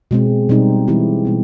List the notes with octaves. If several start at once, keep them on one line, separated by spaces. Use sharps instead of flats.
B2 G#3 C4
B2 G3 C4 D#4
E3 G#3 C4 E4 G4
B2 G3 B3